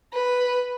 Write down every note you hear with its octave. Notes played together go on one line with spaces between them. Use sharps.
B4